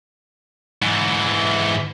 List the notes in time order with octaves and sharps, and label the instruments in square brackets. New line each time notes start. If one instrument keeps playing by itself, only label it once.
[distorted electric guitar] G#2 E3